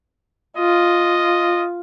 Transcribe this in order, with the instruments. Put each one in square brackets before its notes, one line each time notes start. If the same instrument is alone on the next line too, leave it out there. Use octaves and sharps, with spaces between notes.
[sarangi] F4 [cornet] D#5